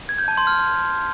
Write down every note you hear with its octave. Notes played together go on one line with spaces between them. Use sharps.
G#6
G6
A5
C6
F6